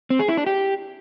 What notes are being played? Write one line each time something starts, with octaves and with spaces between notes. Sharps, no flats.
C4
G#4
E4
D4
G4